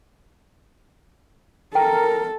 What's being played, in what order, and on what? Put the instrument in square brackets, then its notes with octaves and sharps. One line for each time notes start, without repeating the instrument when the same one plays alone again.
[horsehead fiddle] A4 [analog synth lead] A#4 [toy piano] G5